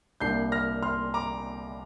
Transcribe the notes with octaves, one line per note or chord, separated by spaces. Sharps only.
C2 A#2 A#3 D4 G6 C7
F6 A#6
C6 F6
A#5 D6